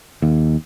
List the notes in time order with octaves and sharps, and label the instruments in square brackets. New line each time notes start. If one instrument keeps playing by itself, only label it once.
[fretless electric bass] D#2